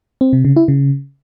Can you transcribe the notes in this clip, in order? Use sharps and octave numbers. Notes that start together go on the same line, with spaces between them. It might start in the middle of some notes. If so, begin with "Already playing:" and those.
C4
C3
C#3
E4
C#3